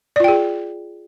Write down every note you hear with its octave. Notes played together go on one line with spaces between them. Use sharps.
F4 G#4 D5 G5